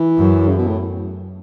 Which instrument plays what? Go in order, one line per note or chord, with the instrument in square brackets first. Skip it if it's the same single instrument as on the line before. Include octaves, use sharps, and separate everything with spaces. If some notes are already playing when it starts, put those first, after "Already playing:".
Already playing: [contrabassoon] E3
[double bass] F#2
[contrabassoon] C#3
B2
A2